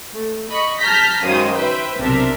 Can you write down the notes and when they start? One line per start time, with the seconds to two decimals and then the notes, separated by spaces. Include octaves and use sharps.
0.14 A3
0.50 D#5 B5 C#6
0.79 A5 A#5 F6 G6 A#6 B6
1.23 F#2 D#3 G#3 C5 F5 D#6
1.53 B4 C5 E5 G5
1.99 B1 C3 D4 A#4 E5